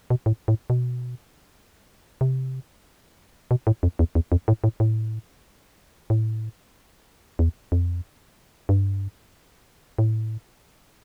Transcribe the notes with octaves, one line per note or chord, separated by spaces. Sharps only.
B2
A2
A2
B2
C3
B2
A2
F2
E2
E2
F2
A2
A2
A2
A2
E2
F2
G2
A2